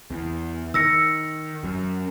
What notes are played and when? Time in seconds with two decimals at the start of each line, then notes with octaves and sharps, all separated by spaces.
0.10 E2
0.74 D#3 E6 A#6 C#7
1.64 F#2